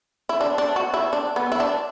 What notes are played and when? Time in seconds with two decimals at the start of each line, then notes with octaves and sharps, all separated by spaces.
0.29 E4
0.41 D4
0.58 D4
0.76 F#4
0.94 E4
1.13 D4
1.36 B3
1.52 E4
1.60 D4